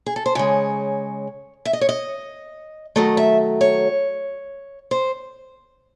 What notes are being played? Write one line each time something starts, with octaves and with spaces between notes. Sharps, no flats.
G#4
A4
C5
C#3 G#3 C#5
E5
D#5
C#5
D#5
D#3 F#3 A3 D#5
E5
C#5
C5